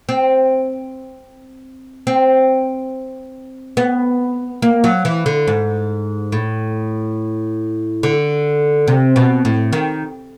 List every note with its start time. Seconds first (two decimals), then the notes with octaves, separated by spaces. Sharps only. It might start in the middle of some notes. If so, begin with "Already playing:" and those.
0.09 C4
2.07 C4
3.77 B3
4.62 A#3
4.84 F#3
5.05 E3
5.26 D3
5.47 G#2
6.32 A2
8.03 D3
8.88 C3
9.16 B2
9.45 A2
9.73 D#3